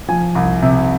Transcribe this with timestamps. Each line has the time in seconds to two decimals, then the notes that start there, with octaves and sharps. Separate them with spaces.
0.08 F3 G#5
0.35 C2
0.62 C3